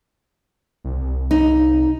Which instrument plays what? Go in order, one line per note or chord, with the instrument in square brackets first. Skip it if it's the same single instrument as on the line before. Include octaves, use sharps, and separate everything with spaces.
[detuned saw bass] C2
[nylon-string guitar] D#4